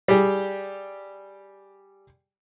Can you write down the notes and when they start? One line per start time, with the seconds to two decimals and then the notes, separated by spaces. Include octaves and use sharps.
0.08 G3 G4 G#4